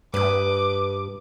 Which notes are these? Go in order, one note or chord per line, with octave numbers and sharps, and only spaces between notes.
G2 B4 D#5 D6